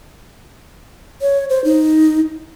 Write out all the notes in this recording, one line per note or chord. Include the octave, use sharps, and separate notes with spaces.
C#5
C5
D#4